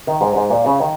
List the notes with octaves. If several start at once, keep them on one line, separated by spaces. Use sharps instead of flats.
D#3
G#2
G#2
A#2
C#3
D#3